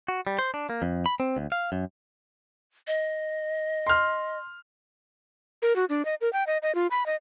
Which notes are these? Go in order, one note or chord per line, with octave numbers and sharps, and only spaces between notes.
F#4
G3
C5
D4
A#3
F2
B5
C4
D2
F5
F#2
D#5
C6 F6
A#4
F#4
D4
D#5
A#4
G5
D#5
D#5
F4
B5
D#5